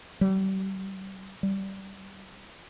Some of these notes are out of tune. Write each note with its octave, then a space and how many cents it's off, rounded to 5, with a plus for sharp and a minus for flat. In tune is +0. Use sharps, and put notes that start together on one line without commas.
G3 -35
G3 -15